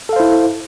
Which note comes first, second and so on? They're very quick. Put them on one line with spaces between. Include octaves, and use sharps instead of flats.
A4 F5 C5 E4